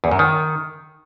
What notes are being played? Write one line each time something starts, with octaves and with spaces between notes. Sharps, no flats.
E2
F#2
D#3